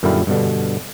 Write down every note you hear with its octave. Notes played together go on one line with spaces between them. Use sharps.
F#2 A#2 D3 G3 E4 F5
G2 B2 D3